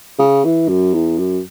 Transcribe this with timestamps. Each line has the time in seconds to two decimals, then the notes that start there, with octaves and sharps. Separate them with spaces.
0.19 C#3
0.44 E3
0.69 F#2
0.93 E2
1.18 F#2